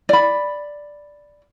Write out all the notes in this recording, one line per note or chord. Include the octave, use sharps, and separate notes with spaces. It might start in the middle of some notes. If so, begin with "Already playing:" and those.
D5 B5